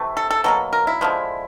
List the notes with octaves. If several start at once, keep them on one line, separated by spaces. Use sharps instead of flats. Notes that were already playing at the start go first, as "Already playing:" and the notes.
Already playing: C3 E3 A3
A4
A4
B2 F#3 A#3 A4
A#4
E4
D3 F3 G#3